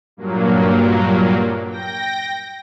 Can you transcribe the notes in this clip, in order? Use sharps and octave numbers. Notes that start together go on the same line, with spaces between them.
G2 A#2 F#3 A#3
G5 A#6